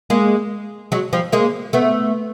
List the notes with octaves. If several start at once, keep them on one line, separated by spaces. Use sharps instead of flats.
G#3 A#3
F#3 G#3
F3 G3
G#3 A#3
A3 B3